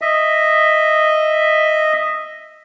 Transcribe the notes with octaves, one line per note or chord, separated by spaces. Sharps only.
D#5 E5